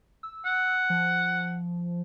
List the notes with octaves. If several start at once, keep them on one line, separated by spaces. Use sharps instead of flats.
E6
F#5
F3